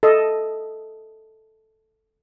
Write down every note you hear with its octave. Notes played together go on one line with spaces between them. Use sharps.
A4 D#5